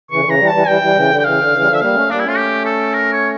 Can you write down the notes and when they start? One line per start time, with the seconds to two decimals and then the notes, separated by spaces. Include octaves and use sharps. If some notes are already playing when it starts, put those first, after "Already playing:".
0.11 C#3 E3 C#6
0.20 D3
0.25 C#3 E3
0.30 A#5
0.39 E3 G3
0.49 A5
0.54 E3 G3
0.67 E3 G3 G5
0.81 E3 G3
0.96 C#3 E3
1.09 D3
1.19 G5
1.24 C#3 E3 F5
1.39 D3
1.53 C#3 E3
1.61 G3
1.66 D3 F3
1.74 E5
1.81 G3 A#3 F5
1.94 A3 C#4
2.10 G3 A#3 D4
2.19 A3 C#4 E4
2.28 F4
2.37 G4
2.65 A4
2.94 A#4
3.12 C#5